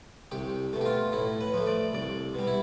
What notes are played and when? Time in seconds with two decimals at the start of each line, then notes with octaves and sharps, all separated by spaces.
0.32 C2 G4
0.73 B2 A3
0.81 G4
0.86 F4
1.12 A2 E4
1.41 B4
1.54 F3 A3
1.67 D5
1.93 C2 D5
2.35 B2 G3
2.47 E4